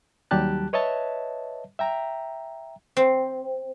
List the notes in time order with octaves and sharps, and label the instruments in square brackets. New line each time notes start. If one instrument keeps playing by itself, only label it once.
[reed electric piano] D#2 F#3 G3 G4 A5 F#6
B4 C#5 D#5 E5 A5
E5 G5 A#5
[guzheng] C4